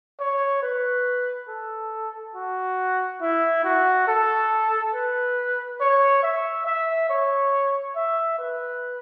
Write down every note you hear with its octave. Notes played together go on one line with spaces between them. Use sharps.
C#5
B4
A4
F#4
E4
F#4
A4
B4
C#5
E5
E5
C#5
E5
B4